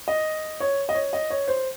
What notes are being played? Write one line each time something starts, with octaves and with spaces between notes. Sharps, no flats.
D#5
C#5
D#5
C#5
D#5
C#5
C5